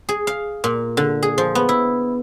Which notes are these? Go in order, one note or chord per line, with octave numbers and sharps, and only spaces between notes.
G#4
F5
A#2
D3
G#4
F3
B3
E4